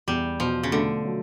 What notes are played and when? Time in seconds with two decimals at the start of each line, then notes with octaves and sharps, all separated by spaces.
0.08 E2 G3
0.40 B2 F3
0.63 C#3
0.72 D3 A3
1.05 F#3